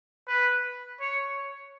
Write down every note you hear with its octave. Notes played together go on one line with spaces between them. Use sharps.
B4
C#5